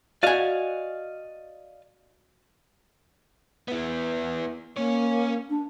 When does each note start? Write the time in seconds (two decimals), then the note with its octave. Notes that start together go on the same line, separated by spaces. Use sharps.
0.23 F#4 D5 D#5 F5 G#5
3.68 B3 E4
4.77 A#3 C#4 C#5
5.50 D4